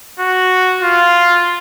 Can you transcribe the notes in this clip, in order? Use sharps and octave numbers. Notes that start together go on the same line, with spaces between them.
F#4
F4